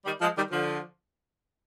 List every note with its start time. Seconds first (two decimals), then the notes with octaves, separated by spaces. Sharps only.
0.05 D#3 G3
0.20 F3 G#3
0.36 D#3 G3
0.51 D3 F3